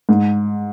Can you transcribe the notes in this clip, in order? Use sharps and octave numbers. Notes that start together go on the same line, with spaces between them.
G#2